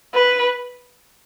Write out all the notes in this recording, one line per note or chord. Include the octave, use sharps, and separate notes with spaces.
B4